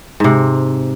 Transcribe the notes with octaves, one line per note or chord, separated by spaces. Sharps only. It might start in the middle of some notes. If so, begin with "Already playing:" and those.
G#2 C3